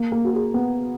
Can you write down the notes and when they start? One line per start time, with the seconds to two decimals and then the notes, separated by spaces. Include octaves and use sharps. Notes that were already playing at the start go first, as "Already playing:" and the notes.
Already playing: A#3
0.12 A#3
0.25 F#4
0.33 G#4
0.54 B3